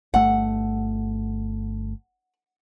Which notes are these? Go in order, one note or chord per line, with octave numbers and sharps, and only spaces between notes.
G1 A3 F#5